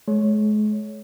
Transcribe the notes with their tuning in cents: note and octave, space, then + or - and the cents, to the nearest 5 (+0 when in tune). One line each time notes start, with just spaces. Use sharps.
G#3 +40 C#5 +5